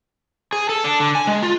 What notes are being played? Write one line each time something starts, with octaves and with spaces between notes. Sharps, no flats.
G#4
A4
D4
D3
G#5
G#3
F4